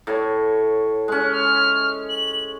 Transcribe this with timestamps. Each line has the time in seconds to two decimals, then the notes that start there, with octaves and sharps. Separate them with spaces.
0.07 A2 C#5
1.08 G#3 C#4 F#6
1.33 F6
2.09 F#7